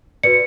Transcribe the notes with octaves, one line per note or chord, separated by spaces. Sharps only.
F#4 B4 D5 C#7